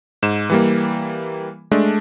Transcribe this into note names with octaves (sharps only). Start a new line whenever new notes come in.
G#2 E7
E3 G3 A#3
G#3 A3 D4